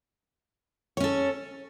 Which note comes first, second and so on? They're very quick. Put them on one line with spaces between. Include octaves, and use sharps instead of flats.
C#5 C#4 A4